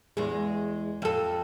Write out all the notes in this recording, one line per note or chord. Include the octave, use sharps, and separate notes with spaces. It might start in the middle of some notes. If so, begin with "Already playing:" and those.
E2 G#3
F2 A4